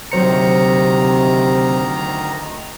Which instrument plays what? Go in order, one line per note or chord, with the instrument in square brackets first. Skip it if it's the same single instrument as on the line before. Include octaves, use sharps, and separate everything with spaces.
[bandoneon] D2 D#3 A#5 [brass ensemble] C3 [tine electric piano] F#3 C5 C#7